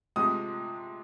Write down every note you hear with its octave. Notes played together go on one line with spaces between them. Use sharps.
C3 F3 G#3 D#6